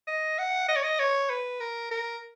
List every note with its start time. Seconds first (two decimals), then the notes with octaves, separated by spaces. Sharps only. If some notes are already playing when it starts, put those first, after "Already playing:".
0.07 D#5
0.38 F#5
0.68 D#5
0.76 C#5
0.83 D#5
0.99 C#5
1.30 B4
1.60 A#4
1.91 A#4